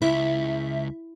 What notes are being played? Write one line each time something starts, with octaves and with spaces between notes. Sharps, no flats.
C#2 E4 E5